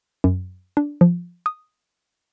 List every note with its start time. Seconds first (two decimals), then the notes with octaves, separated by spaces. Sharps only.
0.24 F#2
0.77 D4
1.01 F3
1.46 D#6